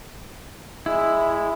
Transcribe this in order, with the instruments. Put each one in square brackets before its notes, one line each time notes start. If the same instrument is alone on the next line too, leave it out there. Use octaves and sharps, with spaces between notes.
[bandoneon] G#3 [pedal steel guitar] E4